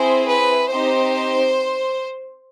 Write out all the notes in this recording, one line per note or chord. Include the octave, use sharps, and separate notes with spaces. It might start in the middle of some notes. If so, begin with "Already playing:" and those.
Already playing: C4 E4 G#4 C5
B4
C4 D#4 G4 C5